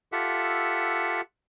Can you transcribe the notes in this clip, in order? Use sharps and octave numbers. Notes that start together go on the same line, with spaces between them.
F4 G4 A4 E5 F#5